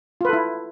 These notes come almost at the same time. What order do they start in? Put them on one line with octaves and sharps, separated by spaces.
F4 B4 A4 E4